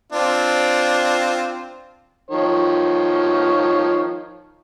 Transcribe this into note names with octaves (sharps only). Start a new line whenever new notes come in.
C4 D4 F4
D#3 F3 C#5